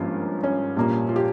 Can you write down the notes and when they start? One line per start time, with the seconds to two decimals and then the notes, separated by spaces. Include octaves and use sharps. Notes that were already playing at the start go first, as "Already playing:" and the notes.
Already playing: G#1 G2 F3 A#3 C#4 F4
0.43 C#4
0.76 A#1 A#2 G3 A#3
1.09 F4
1.16 G4